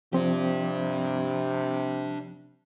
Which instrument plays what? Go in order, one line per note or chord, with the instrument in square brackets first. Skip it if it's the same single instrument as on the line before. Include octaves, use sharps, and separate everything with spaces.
[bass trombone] C3 [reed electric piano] F3 C4 [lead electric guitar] D4 G4